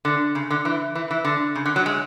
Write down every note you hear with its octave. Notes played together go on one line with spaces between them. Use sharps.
D3
C#3
D3
E3
E3
E3
D3
C#3
D3
F#3
G#3